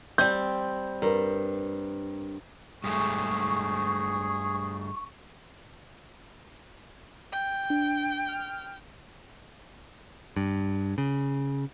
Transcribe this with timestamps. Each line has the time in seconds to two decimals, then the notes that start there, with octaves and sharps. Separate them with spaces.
0.18 G3 C4 G6
1.02 G2 A#4
2.84 G2 G#3 A3 G#4 C#6
7.32 G5
7.70 D4
8.29 F6
10.37 G2
10.98 C#3